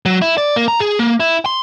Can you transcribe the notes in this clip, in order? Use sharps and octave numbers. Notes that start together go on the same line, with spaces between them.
F#3
E4
D5
A#3
A#5
G#4
A#3
E4
C6